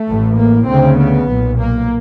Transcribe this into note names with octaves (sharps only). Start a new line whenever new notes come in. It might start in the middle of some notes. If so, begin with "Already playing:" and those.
Already playing: A3
A1 A2
A#3
D2 C#3 C4
B3
B1 A#2
A#3